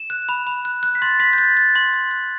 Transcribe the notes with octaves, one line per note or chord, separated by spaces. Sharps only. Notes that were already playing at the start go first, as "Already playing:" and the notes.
Already playing: E7
F#6
B5
B5
F#6
F#6
B6
C6 A6
C6 B6
G6
F#6 A6
F#6 A6
C6
C6
F#6